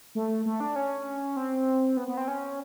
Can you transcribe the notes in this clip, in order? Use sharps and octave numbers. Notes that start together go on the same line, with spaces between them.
A3
A3
D4
C#4
C4
B3
B3
C4
C#4